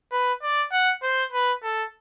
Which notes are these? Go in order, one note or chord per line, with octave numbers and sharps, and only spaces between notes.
B4
D5
F#5
C5
B4
A4